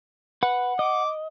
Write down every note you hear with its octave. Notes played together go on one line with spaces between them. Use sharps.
B4 F#5
D#5 D6